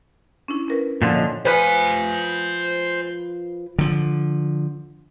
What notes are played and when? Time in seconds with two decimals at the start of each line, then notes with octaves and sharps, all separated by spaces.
0.48 C#4 D4 E4
0.68 C#4 A#4 B4
1.02 A#2 D3 F3 F5 A6
1.14 C#5 D#5
1.45 F3 B4 C5 G#5
3.79 D3 F3